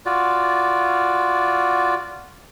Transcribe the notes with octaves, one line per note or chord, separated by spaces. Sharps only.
F4 F#4 D5